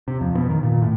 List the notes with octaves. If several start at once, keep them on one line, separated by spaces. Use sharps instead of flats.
C3
F2
B2
D#3
A#2
A2